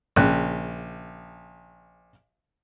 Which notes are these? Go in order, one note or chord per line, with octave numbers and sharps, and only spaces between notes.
A#1 C#3 G5 F#6